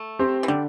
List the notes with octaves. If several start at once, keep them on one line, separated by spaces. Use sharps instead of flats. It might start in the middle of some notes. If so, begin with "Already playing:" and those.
Already playing: A3
C4 G4 C5
E3
D3 G3